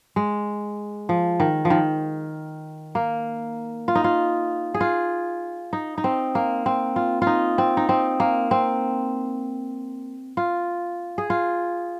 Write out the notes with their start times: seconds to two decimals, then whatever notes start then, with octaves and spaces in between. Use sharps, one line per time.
0.16 G#3
1.09 F3
1.40 D#3
1.65 F3
1.70 D#3
2.95 A#3
3.88 F4
3.95 D#4
4.04 F4
4.74 G#4
4.81 F4
5.73 D#4
5.98 D#4
6.04 C4
6.35 A#3
6.66 C4
6.96 F4
7.22 F4
7.27 D#4
7.58 C4
7.77 D#4
7.89 C4
8.20 A#3
8.51 C4
10.37 F4
11.18 G#4
11.30 F4